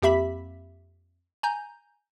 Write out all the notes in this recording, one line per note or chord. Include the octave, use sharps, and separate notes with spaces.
F2 A#3 G4 E5 B5 B6
G#5 A#5 G6